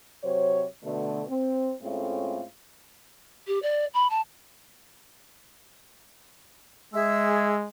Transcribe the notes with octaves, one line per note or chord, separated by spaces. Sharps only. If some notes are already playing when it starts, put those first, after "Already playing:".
C3 F#3 C5 C#5
B2 D3 A3
C4
A2 G#3 A3 C4 C#4 F4
G4
D5
B5
A5
G#3 G#4 E5 E6